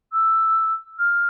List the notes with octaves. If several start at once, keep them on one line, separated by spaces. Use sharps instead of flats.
E6
F6